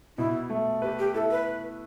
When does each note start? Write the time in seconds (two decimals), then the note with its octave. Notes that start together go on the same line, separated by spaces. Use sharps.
0.18 B2 E4
0.50 A3
0.82 G4 B4
0.99 G4
1.14 E4 A4
1.31 B4